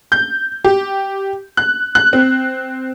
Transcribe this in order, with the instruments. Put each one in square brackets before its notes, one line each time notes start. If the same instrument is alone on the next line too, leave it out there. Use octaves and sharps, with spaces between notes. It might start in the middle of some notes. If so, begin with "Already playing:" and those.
[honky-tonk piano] G6
G4
F#6
F#6
C4